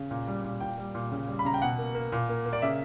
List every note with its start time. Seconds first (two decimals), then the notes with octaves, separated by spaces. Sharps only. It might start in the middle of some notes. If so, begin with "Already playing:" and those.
Already playing: C#3
0.11 A#2
0.27 G3
0.44 A#2
0.60 A#2 G5
0.78 G3
0.95 A#2
1.12 C#3
1.28 G3
1.39 B5
1.45 C#3 A#5
1.54 G5
1.62 B2 F#5
1.78 A#3
1.95 A#3
2.12 A#2
2.29 A#3
2.46 A#3
2.53 D5
2.62 C#3 E5